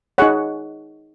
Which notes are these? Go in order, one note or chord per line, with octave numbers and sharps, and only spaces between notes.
D#4 G#4 C#5 F#5